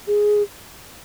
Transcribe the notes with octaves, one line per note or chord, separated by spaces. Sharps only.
G#4